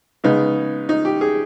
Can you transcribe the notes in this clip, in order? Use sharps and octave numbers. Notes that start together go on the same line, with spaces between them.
C#3 G#3 B3 D#4
D#4
G4
G#4